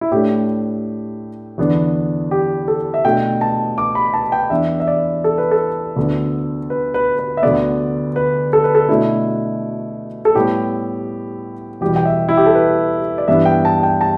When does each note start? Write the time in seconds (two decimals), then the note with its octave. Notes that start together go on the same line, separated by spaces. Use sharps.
0.01 E4
0.12 A2 A3 D4 G4
1.58 E2 D3 B3 D4
2.31 G4
2.68 A4
2.94 E5
3.05 B2 A3 D4 G5
3.41 A5
3.78 D6
3.95 B5
4.14 A5
4.32 G5
4.50 E2 E3 B3 D4 E5
4.80 E5
4.88 D5
5.24 A4
5.38 B4
5.51 A4
5.96 D2 D3 B3 D4
6.70 B4
6.94 B4
7.19 B4
7.37 E5
7.43 D2 D3 B3 D5
8.16 B4
8.53 A4
8.64 B4
8.75 A4
8.89 B2 A3 D4 E4
10.25 A4
10.35 A2 G3 B3 G4
11.81 E2 B2 G3 G4
11.96 G5
12.05 E5
12.29 E4
12.37 G4
12.46 A4
12.55 B4
13.18 D5
13.28 G2 E3 B3 D4 E5
13.45 G5
13.65 A5
13.83 G5
14.01 A5